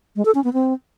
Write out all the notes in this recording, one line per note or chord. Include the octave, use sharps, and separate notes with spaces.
G#3
A4
C#4
B3
C4